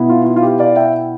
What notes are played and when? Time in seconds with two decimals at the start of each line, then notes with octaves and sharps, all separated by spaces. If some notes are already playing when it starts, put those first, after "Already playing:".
Already playing: B2 B3 E4
0.10 F4
0.25 F4
0.36 F4
0.42 G4
0.59 D5 F5
0.76 E5 G5